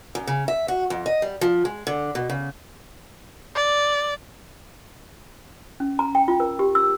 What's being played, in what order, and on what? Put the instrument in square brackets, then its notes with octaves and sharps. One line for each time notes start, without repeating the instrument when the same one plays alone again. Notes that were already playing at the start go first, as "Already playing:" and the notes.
[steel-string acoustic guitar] F#2
C#3
E5
F#4
F2
D#5
G3
F3
G#3
D3
B2
C#3
[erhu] D5
[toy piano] C#4
A#5
G5
F4
A#4
G4
E6